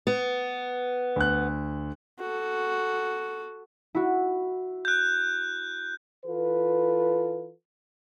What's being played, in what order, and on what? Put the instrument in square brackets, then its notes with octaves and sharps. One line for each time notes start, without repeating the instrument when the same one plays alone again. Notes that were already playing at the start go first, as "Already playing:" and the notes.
[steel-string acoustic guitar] B3
[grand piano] D2 F#6
[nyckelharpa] F#4 A4
[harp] E4 F#4
[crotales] F#6 G6
[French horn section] E3 F4 A4 B4